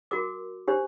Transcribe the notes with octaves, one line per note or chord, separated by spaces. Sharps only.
F#4 A#4 D6
D4 G4 C5